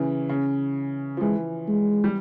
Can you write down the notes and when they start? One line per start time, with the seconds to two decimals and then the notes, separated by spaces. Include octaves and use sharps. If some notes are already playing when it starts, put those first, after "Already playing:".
Already playing: C#3 E3
0.29 C#3
1.17 F3
1.21 E3 G#3
1.68 G#3
2.04 G3